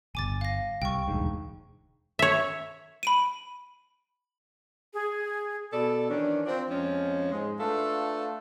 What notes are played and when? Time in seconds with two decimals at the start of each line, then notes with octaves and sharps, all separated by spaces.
0.15 D1 G1 G#5 D6 A6
0.41 F5 A#6
0.82 C2 G5 C#6
1.08 E1 D2 G#2
2.19 C#5 E5
3.03 B5 D7 D#7
4.94 G#4
5.72 B2 A4 D5
6.09 D#3 E3 C#4 D4
6.46 C4 D4 F4
6.69 F2 F3 G#3 C4 C#4
7.32 G#2 G#3
7.60 A3 D4 F4 A4 B4 F5